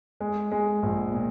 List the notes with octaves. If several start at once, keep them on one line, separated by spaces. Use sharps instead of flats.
G#3
G#3
A#1
A#2